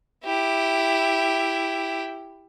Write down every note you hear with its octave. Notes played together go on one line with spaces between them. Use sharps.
E4 G4